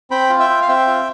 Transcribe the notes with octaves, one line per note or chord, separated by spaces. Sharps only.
C4 G5 B5
F4
E5 G5
F4
F5
C4 E5 G5
F4